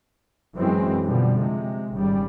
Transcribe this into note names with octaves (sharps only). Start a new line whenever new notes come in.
F#2 E3 G#3 C4
B2 D3 F3 G3
C3 G#3
G#1 C#3 G3